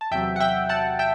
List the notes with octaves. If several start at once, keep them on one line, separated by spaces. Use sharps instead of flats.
A5
E2 C3 F#3 E5 G5
F#5
E5 G5
F#5 A5
E5 G5